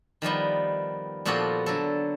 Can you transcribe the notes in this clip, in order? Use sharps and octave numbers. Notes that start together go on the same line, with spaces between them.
D#3 F3 G3 B3
A#2 F3 B3 F#4 G4 A4
D3 F#3 A4